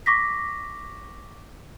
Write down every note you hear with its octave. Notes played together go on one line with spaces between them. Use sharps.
C#6 D6 A#6 B6